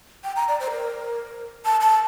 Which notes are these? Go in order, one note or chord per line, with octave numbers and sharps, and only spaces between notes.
G5
A#5
D5
C5
A#4
A5
A5